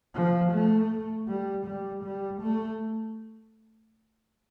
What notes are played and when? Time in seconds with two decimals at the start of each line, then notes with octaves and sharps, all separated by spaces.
0.14 F3
0.52 A3
1.28 G3
1.66 G3
2.03 G3
2.42 A3